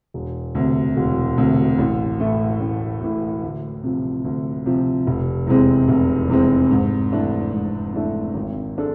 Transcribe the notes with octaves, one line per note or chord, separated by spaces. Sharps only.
E1
D2 C3
E1
D2 C3
A1
A2 E3 A3
A1
A2 E3 A3
D2
C3 F3
D2
C3 F3
F1
E2 C3 G#3 C4
F1
E2 C3 G#3 C4
G#2
E3 A3 D4
G#2
E3 A3 D4
G#1
G#3 D4 A4